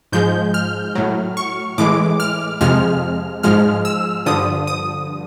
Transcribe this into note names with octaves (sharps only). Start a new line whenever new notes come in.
G#2 F3 G#3 G6
F6
A2 F#3
C#6
A2 E3 G#3 D6
F6
F2 C3 F3 G#3 F6
G#2 F3 G#3 F6
E6
G2 D3 F3 D#6
D#6